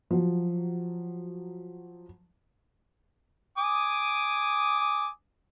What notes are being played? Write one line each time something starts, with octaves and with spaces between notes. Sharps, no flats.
F3 F#3
G#5 D6 D#6